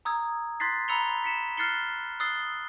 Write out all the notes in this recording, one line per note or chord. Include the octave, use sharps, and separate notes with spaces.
A#5 D#6 E6 G#6
C6 F#6 G#6 A6 B6 C7
A#5 B5 E6 C#7 F7 G7
B6 C#7 E7
F6 F#6 A6 C7 C#7 G7
D#6 E6 F#6 A6 C7 G7